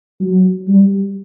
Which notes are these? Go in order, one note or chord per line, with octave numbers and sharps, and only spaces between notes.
F#3
G3